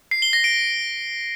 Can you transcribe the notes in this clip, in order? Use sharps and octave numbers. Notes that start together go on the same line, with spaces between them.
C7
G7
A#6
D7